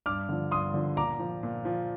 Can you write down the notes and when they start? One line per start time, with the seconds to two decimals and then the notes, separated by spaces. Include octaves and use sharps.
0.06 G2 D6 F6
0.29 D3 F3
0.51 G2 C6 D#6
0.74 D3 F3
0.97 A#2 A#5 D6
1.19 F3
1.43 A#2
1.65 F3